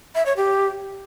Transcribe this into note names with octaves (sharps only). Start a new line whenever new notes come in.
E5
C#5
G4